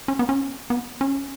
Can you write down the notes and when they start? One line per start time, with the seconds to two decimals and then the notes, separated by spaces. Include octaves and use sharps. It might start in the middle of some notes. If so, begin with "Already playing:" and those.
0.08 C#4
0.19 B3
0.29 C#4
0.70 B3
1.01 C#4